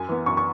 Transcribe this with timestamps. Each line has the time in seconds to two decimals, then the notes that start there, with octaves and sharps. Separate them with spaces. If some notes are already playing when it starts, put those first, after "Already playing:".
Already playing: F#2 G#5
0.09 E3 B3
0.26 F#2 C#6
0.37 C#6